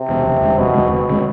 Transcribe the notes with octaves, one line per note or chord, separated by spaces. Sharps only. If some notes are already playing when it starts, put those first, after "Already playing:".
Already playing: C3
E2 B2
F1
E2 D3 G#3
F1 B2
E2 D3 G#3
F1 B2
D3 G#3